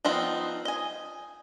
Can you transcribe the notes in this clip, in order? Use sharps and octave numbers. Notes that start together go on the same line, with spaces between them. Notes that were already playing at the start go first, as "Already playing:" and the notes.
F3 B3 C4 D#4 F4
D#5 G#5